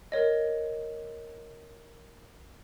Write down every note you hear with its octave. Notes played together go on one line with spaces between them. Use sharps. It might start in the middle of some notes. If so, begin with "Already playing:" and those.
A#4 C#5 D#5